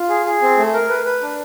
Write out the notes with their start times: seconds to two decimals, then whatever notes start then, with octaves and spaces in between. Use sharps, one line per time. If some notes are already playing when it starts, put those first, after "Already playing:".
Already playing: F4
0.09 G#4
0.26 G#4
0.42 C4
0.57 A3
0.74 A#4
0.89 B4
1.05 B4
1.22 D4